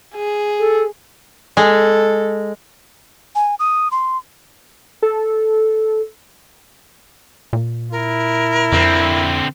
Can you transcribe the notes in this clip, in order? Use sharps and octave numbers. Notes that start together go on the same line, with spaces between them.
G#4
A4
G#3 A4
G#5
D#6
C6
A4
A#2
E4 A#4
F2 D3 C4